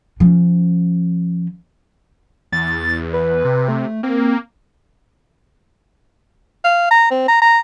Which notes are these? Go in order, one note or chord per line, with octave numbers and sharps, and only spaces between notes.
F3 C#4
E2 A6
B4
C3
A3
A#3 C4
F5
A#5
C4
A#5
A#5